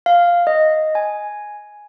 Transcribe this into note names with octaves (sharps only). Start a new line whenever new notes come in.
F5
D#5
G#5